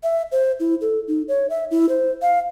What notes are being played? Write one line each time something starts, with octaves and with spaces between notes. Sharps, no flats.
E5
C5
E4
A4
D#4
C#5
E5
E4
C5
F5